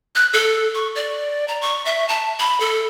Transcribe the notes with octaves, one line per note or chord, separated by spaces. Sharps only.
F#6
A4
C#6
D5
A#5
C#6
E5
A5
B5
A4